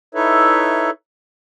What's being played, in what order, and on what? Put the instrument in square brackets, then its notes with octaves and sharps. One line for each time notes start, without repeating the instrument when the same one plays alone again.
[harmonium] D#4 E4 A4 B4 C#5 E5